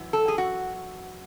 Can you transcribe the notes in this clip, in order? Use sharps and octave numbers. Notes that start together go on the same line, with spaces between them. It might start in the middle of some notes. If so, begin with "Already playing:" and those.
Already playing: F#2 E3
A4
G#4
F#4